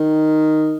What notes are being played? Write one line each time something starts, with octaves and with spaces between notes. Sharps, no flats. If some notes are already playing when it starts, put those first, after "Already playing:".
Already playing: D#3